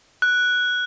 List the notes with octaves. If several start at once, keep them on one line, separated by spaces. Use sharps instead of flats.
F#6